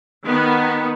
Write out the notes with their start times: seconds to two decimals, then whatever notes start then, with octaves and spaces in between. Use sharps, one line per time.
0.24 D#3 B3